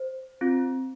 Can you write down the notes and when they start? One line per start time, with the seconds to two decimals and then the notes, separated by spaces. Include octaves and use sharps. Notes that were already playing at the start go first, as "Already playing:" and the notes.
Already playing: C5
0.41 C4 F4